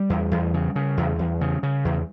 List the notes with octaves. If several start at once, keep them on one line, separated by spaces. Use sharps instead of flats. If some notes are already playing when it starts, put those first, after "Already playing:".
Already playing: G3
E2
E2
C#3
C#3
E2
E2
C#3
C#3
E2